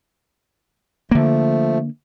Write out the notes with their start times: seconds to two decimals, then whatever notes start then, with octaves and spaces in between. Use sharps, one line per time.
1.11 D3 F3 A3 A#3